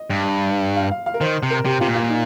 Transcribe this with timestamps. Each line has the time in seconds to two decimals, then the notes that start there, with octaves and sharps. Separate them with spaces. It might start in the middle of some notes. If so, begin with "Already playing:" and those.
Already playing: D#5
0.10 G2
0.76 F5
0.91 F5
1.06 F5
1.14 A#4
1.21 D#3 C5
1.43 C3
1.51 A#4
1.65 C3 G4
1.80 C3 F4
1.88 A#2
1.95 F4
2.10 D#4